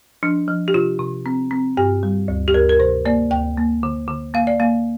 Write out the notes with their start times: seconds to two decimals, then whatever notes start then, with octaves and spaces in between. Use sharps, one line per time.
0.23 F3 D4
0.48 F3
0.68 G4
0.74 C3 F4
0.99 C3
1.26 C4
1.51 C4
1.77 G2 G4
2.03 G3
2.28 D2
2.48 G4
2.54 D2 A#4
2.69 A#4
2.79 C3 C5
3.05 A#3 D5
3.31 D2 G5
3.57 A#3
3.83 D3
4.08 D3
4.34 A#3 F5
4.47 D5
4.60 A#3 F5